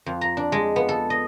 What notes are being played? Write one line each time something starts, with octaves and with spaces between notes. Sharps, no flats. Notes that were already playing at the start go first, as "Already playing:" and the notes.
F2
A#5
D4
G#3
B3
A4
D#5